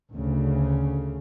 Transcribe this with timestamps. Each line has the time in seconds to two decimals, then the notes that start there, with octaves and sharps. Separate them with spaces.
0.13 D2 C#3